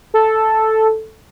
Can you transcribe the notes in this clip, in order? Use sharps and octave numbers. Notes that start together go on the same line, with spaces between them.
A4